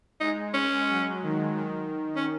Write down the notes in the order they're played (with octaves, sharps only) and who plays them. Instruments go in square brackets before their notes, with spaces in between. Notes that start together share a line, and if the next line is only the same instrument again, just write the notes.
[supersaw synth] G#3 [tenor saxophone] D#4
[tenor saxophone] C#4
[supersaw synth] F#3
D#3
D#3
[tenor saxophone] C#4